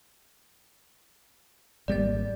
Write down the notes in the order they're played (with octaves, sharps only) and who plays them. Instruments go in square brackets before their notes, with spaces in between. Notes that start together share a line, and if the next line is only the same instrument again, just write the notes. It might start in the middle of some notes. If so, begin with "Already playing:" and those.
[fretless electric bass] G#1 G3 A#3 [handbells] D5 A6